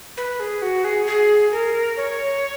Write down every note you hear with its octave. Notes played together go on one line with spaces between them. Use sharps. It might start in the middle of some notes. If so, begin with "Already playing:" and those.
B4
G#4
F#4
G#4
G#4
A#4
C#5